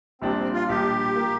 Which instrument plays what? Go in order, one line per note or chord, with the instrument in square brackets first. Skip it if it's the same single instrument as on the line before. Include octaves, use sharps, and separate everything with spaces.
[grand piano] A#1 A#2 G3 D4 [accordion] C4
[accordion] C4
F4
[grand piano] A#1 A#2 G3 D4 [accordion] G4
[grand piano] A#2 A#3